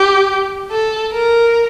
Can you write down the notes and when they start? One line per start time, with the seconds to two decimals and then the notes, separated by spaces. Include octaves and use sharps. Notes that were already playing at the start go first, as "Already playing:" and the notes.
Already playing: G4
0.71 A4
1.12 A#4